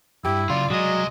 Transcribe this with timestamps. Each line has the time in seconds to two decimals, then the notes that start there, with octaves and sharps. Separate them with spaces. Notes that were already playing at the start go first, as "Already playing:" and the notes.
0.25 E2 G2 E4 G4
0.50 C#3 F#3 F4 D5
0.70 C2 F#3 G#3 D#5